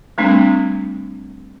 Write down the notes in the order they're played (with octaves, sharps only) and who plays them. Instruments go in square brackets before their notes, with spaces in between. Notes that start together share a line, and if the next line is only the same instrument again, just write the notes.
[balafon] G3 A3 C4 D4